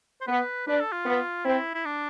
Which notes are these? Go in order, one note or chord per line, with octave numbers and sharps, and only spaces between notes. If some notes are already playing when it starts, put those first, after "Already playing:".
C5
B3 B4
D4 B4
A4
F4
B3
C4 E4
E4
D4